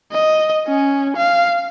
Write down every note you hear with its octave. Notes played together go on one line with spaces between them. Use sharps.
D#5
C#4
F5